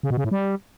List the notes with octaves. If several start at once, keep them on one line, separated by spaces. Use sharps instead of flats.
C#3
B2
C#3
A2
G3